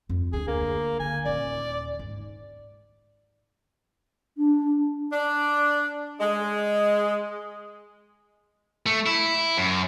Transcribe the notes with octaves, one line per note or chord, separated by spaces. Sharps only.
F2
D2 D4 G#4
A#3
D3 A#3 G#5
D#1 D5
G#2
D4
D4
G#3
A3
E4
F#2